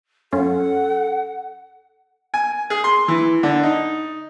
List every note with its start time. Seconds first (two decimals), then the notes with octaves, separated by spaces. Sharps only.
0.33 F#2 C#4 F4 A4 F#5
2.34 G#5
2.70 G#4
2.84 C6
3.08 E3
3.43 D3
3.63 D#4